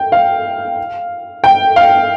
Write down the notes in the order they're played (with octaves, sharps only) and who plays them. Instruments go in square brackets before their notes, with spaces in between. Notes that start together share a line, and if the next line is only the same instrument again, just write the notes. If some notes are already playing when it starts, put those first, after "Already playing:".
Already playing: [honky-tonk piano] G5
F5
G5
F5